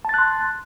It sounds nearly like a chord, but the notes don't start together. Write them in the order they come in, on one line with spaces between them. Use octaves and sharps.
A5 A6 F#6 C6